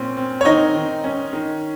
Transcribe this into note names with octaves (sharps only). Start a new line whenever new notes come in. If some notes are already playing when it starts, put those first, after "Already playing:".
Already playing: A#2 C4 C#4
C4
C#5
D#3 D#4 D#5
D#3
C#4
D#3